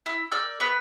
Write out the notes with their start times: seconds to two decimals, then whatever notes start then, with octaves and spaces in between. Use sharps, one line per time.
0.06 E4 E6
0.32 A#4 D5 E6 G6
0.60 B3 B4